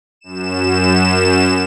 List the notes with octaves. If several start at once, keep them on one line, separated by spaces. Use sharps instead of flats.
F#2 E7